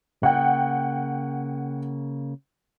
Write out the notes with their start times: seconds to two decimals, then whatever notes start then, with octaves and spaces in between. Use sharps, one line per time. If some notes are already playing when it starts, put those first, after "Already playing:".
0.23 C#3 A#3 F#5 G5